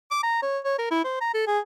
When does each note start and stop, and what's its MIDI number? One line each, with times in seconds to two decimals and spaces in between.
0.11 0.20 86
0.23 0.42 82
0.42 0.58 73
0.64 0.74 73
0.78 0.89 70
0.91 1.03 64
1.04 1.19 72
1.21 1.31 82
1.34 1.46 69
1.47 1.59 68